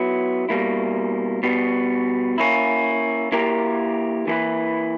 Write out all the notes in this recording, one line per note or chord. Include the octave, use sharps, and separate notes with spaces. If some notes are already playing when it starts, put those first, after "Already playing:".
Already playing: F#3 B3 E4
B2 G3 A#3 E4
B2 G3 B3
A#3 C#4 E4
A#3 E4 G4 A#4
E3 A#3 E4 B4